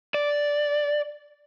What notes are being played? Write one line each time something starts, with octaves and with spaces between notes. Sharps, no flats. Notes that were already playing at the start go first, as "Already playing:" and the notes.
D5